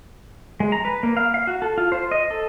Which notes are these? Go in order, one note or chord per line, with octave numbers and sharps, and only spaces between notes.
G#3
A#5
B4
A#3
F5
F5
F#4
A4
F4
C5
D#5
A4